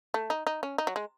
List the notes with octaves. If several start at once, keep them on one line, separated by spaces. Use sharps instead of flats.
A3
D#4
D#4
C#4
D#4
F#3
G#3